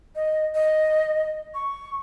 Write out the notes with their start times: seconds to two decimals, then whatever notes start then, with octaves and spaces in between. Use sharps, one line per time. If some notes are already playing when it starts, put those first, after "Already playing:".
0.15 D#5
0.55 D#5
1.54 C#6